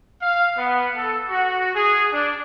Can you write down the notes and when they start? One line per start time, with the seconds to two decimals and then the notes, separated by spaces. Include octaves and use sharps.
0.22 F5
0.58 B3
0.97 A4
1.29 F#4
1.75 G#4
2.12 D4